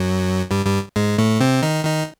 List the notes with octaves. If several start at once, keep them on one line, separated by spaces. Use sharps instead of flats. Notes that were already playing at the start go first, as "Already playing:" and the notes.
Already playing: F#2 F#3
G2 G3
G2 G3
G#2 G#3
A2 A3
C3 C4
D#3 D#4
D#3 D#4